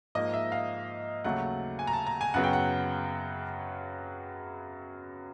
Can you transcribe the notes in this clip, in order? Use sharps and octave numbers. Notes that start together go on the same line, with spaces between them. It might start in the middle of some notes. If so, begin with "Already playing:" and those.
G#2 F3 A#3 D#5
E5
F5
D#2 C#3 F#3 A3 F#5
G#5
A#5
A5
A#5
G#5
F#2 C#3 F#3 B3 F#5
G5
F#5